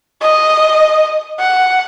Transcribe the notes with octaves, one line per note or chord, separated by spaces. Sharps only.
D#5
F#5